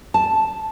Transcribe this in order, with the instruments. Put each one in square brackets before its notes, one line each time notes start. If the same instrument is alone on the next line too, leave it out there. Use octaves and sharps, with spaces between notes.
[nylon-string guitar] A5